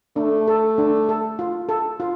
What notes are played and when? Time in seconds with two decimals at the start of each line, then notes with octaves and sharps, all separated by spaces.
0.16 A3 D4
0.48 A4
0.78 D4
1.09 A4
1.39 F4
1.69 A4
2.00 F4